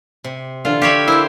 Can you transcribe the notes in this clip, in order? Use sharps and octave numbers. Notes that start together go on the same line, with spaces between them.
C3
D3 E3 D4 F4
G4 C#5 E5 F5 G5 B5
A#3 E4 C5 G5 A5